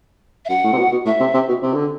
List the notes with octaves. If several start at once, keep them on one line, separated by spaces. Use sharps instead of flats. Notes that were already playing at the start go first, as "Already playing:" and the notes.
E5
F#2 F#5
A2
C3
B2
B2
A2 E5
C3
C3
B2
C3
D3